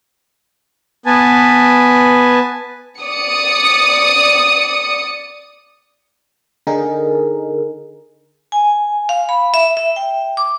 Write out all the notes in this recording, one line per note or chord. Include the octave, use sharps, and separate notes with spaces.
B3 B4 G#5 A5
D5 D#6 C#7
D3 D#4 G#4 A#4
G#5
F5
B5
E5
E5
G5
D6